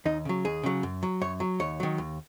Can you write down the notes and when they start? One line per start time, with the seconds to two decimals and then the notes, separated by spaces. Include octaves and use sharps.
0.05 D#2 D#4
0.25 C#3 F#3
0.45 D#2 G#4
0.63 C#3 F#3
0.83 F#2
1.03 F#3
1.21 F#2 C#5
1.40 F#3
1.60 D#2 C#5
1.80 D#3 F#3
1.98 D#2